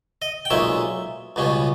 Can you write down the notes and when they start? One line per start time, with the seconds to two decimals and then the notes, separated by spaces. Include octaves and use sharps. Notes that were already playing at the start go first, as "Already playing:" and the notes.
0.22 D#5
0.45 G5
0.50 B1 A#2 G#3 C#4 E5
1.36 C#2 B2 G3 C#4